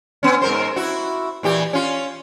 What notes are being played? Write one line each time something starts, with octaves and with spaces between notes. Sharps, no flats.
B3 C#4
G#2 A#4 C5
E4 F#4
A#2 E3 G4
C#4 F4